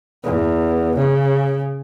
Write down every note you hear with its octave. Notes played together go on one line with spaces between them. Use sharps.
E2
C#3